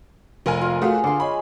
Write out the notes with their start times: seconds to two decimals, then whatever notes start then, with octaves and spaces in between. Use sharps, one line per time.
0.46 F1 F4 A#4 G#5
0.62 A#3 F4
0.82 A3 F4 F#4 G#4 C5 F5
1.04 D3 C6 D6
1.20 G#3 C#5 G#5 B5